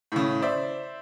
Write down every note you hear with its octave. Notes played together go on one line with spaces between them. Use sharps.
A2 C#3
C5 D5 E5